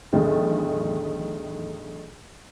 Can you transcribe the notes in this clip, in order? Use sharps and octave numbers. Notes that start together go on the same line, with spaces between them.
B1 E2 A2 D3 D#3